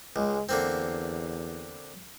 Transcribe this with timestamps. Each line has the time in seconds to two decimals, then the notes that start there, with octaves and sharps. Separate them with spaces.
0.16 C#2 G#3
0.49 E2 D3 A#3 C4